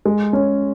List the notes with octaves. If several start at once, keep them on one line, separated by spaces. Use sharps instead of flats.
G#3
C#4